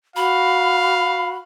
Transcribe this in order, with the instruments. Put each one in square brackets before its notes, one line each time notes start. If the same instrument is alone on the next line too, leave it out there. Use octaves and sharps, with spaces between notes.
[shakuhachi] F#4 [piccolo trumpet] F5 [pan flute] B5